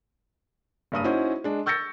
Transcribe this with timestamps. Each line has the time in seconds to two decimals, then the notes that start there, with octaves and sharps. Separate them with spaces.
0.92 F#1 G2 D#6 D#7
1.04 C#4 D#4 E4 F#4 C5
1.44 G#3 D4
1.66 C#6 E6 G6 A6 A#6 C#7